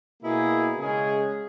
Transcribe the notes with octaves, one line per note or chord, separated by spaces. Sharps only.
B2 A#3 E4 G#4
C#3 G#3 C#4 G#4